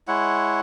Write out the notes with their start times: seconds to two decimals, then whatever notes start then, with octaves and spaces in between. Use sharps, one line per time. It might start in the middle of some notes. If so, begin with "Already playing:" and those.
0.08 G#3 E4 C#5 F#5